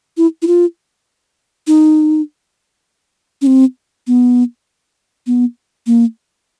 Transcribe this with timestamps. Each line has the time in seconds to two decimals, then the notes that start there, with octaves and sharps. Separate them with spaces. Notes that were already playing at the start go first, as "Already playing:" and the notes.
0.17 E4
0.42 E4
0.47 F4
1.67 D#4
3.42 C#4
3.47 C4
4.07 B3
5.27 B3
5.87 A#3